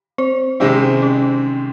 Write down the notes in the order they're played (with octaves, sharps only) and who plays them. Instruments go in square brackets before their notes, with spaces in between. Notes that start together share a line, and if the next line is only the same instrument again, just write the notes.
[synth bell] C4 C5
[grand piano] C3 D#3 G#3 C4 E4 [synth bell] C#4
[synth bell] C#4